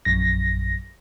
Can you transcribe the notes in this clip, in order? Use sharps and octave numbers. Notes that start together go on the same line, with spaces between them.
A#1 F#2 A#6